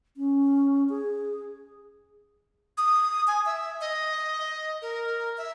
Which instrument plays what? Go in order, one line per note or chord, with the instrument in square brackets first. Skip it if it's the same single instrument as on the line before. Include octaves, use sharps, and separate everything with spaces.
[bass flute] C#4
G#4
[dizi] D#6
G#5
E5
D#5
A#4
E5